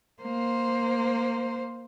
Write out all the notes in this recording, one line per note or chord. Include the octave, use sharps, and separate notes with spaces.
A#3 C5